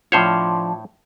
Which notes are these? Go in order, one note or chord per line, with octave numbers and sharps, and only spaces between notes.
A2 F3 D4 F4 C5 C#5